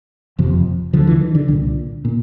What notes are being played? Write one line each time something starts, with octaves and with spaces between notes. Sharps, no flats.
F#1 F2 C3 F3
D2 D3 F3
E3
D#3
D3
C2 A#2 D3
A#2